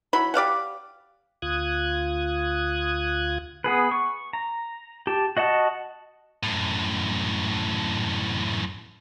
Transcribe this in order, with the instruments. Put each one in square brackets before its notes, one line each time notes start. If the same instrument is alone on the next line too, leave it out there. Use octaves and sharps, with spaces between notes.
[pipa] F#3 E4 B5
G4 D5 F5 F#5
[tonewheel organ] D2 F4 D#6 F#6 G#6
[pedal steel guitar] B3 G#4 B4
C#6
A#5
G4 A5
F#4 D#5 F#5 A5
[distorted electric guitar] F#2 A2